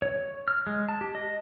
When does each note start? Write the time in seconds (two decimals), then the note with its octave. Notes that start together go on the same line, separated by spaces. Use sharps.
0.02 C#5
0.48 F6
0.67 G#3
0.89 A5
1.01 G4
1.15 D#5